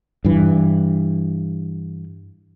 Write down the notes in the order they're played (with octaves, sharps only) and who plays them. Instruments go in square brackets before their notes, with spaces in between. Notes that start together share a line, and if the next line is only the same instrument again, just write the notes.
[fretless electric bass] G2 E3